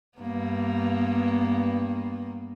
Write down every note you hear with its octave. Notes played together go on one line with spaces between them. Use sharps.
G2 A#3 B3